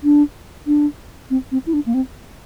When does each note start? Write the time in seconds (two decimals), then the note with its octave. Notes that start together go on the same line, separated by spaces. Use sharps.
0.04 D4
0.67 D4
1.30 C4
1.52 C4
1.67 E4
1.74 D4
1.86 A#3
1.94 C4